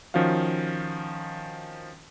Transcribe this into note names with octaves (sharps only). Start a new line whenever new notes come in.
D#3 F3 C#4 F#4 F5